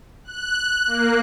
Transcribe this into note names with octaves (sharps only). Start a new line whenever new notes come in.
F#6
A#3